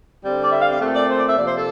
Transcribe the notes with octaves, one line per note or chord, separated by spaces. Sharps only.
D3 G3 C4
D5
E5
F5
F5
A#2 A3 C4
D5
C5
D5
E5
C3 F3 A#3 D5
C5
A4